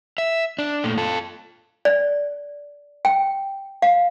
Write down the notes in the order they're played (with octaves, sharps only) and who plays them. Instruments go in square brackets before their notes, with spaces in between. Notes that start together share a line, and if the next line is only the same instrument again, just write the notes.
[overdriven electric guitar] E5
D4
A#2 A3
F4 A4
[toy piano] D5
G5
F5